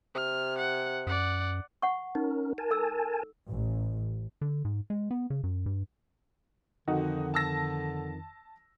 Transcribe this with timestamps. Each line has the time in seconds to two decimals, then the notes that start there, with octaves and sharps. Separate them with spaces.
0.15 C3 F6
0.59 F#5
1.07 F#2 D5 F#5
1.82 F#5 C#6
2.15 C#4 D#4 A#4
2.58 A#4 G#5 A5
2.71 A4 E6
3.49 A1
4.41 D3
4.65 G#2
4.90 G#3
5.11 B3
5.30 C#3
5.44 F#2
5.66 G2
6.88 F2 D3 D#3 D#4 F#4
7.34 A5 E6 A#6